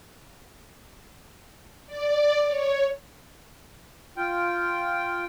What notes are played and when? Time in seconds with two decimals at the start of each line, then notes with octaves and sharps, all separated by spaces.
1.86 D5
2.46 C#5
4.17 F4 G5